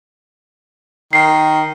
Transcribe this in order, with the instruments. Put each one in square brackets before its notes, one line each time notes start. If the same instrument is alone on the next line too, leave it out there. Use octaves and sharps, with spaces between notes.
[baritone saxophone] D#3 [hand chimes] C7